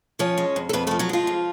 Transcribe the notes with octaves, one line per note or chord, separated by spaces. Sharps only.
F3 C#4 C#5
G#3
F2
A4
F2 B3 B4
F3 A3 A4
F#3 F#4
F3 G#3 F4
F2